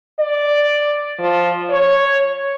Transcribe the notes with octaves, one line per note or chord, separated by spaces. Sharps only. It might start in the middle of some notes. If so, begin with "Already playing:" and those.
D5
F3
C#5